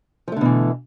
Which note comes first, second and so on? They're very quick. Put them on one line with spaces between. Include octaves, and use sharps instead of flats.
F3 A3 D3 B2 E3